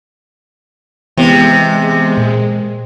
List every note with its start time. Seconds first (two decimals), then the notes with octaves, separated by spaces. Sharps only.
1.17 C3 E3 G#3 B3 C4
2.18 A#2